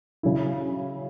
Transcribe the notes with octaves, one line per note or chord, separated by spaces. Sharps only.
C#3 F#3 E4